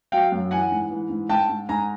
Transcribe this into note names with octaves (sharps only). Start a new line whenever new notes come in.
F#3 F5 G5
F#2
E3 F#5 G#5
G#2
E3
G#2
G#2 G5 A5
G#2
G#2 G#5 A#5